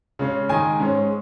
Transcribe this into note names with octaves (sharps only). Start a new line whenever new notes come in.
C#3 G#3 C#4
D#3 G#3 D#4 G#5
G#2 G#3 C#4